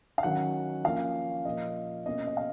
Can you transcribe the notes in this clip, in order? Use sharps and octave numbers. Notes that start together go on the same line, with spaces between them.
F5
D#3 F#3 C#4 F#5
F3 A#3 C#4 F5
A#2 F3 A#3 D#5
B2 A#3 C#4 D#5
D#5
F5